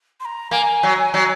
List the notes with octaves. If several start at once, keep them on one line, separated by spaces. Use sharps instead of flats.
C6
A#5
A#3 G#5
F#3
F#3